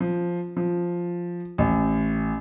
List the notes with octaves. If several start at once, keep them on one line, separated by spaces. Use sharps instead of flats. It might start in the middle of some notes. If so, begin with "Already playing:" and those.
F3
F3
A1